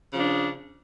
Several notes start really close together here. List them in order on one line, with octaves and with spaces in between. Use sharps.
C#3 F3 D4